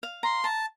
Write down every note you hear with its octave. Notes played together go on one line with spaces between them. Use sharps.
F5
A#5 C6
A5 A#5